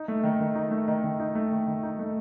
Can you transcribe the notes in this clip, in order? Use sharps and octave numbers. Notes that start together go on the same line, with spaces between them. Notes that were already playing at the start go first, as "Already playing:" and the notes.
Already playing: D#4
A3
D#3
D#3
D#4
A3
D#3
D#3
D#4
A3
D#3
D#3
D#4
A3